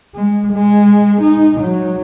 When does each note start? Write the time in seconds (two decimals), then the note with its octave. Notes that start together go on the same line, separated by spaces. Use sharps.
0.15 G#3
0.53 G#3
1.22 D#4
1.61 F#3